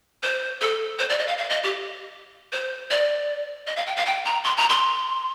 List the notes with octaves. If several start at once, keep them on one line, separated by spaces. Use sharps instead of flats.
C5
A4
C5
D5
D#5
F5
F5
D#5
G4
C5
D5
D#5
F5
G5
F5
G5
A#5
C6
A#5
C6